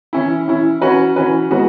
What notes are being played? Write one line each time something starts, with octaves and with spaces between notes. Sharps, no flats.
E3 C#4 E4
E3 C#4 E4
E3 C#4 F#4 B4
E3 C#4 F#4 B4
E3 G#3 B3 F#4 B4